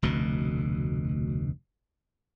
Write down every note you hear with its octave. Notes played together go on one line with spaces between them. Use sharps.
F1 D2 B2